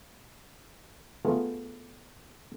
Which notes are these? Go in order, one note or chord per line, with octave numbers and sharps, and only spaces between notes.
A3 B3 F4 G#4